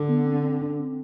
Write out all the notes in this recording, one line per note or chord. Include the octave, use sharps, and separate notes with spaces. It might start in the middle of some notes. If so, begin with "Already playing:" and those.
Already playing: D3
B3
C4
C4
D4
C4